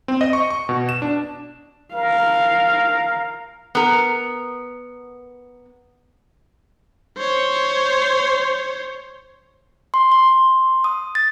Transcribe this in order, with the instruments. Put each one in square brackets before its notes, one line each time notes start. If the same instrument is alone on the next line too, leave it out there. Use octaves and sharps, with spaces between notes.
[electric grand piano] C4
D#5
C#6
C#6
B2
E7
D4
[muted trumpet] A#4 [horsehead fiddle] F5
[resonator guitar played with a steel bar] B3 A#4
[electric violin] C5 C#5
[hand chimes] C6
C6
D#6
A6